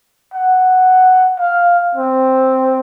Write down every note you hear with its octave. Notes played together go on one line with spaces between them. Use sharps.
F#5
F5
C4